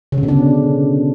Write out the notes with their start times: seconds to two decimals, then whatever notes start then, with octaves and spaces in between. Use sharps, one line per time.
0.12 C#3
0.18 D3
0.23 B2
0.28 D4